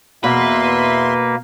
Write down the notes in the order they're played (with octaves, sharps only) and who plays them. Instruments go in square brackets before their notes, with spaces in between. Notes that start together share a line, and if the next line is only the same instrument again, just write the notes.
[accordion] E2 E5 C6 [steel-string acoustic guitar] B2 [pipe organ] A#3 [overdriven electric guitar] B4